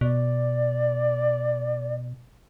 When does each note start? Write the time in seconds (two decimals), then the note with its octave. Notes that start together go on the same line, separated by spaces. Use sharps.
0.01 B2 D5